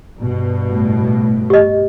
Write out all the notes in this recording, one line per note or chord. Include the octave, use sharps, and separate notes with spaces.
G2 B2
A2
G4 D#5